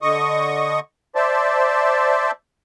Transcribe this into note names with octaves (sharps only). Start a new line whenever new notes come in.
D3 D#5 C#6 D#6
C5 D5 E5 A5